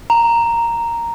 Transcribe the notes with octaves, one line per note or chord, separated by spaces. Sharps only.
A#5